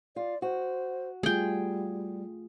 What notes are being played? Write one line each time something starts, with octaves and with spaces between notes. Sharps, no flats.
F4 D5
F#4 C5
G3 A3 F4 G#4 G5